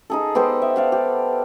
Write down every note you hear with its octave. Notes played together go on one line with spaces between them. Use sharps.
D#4 G#4 A4
B3 G4 A4 C5
E5
D5 F5 F#5
G4